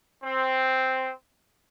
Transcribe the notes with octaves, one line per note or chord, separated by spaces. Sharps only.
C4